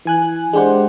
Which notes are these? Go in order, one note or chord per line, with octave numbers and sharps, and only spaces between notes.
E3 G#5 F#6
G#3 D4 G4 C5 F#5